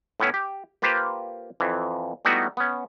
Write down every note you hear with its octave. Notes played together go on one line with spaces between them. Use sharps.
A2 B3 C#4 E4
G4
A#3 F4 G4 B4 C5
F2 E3
G3 A3 B3 D#4 E4 F#4
B3 C#4